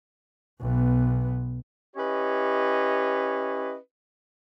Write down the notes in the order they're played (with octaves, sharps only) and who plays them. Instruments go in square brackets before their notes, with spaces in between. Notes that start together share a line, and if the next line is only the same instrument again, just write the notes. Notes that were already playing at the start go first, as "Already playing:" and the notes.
[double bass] B1 B3
[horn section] C#4 E4 G4 B4 C#5 D#5